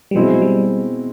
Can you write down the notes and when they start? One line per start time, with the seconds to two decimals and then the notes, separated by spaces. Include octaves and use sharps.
0.11 G3
0.15 B2 F#3 G#3 C4 E4
0.34 F#3
0.42 G3